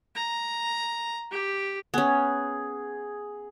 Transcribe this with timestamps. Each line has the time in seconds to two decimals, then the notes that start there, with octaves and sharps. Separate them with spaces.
0.15 A#5
1.31 G4
1.94 B3 C#4 G#4